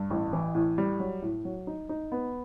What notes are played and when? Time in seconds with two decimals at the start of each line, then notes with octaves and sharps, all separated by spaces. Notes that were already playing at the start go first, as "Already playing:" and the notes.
Already playing: G2
0.11 A1
0.33 E3
0.55 A2
0.78 G3
1.00 F#3
1.22 A2
1.45 F#3
1.67 D#4
1.89 D#4
2.12 B3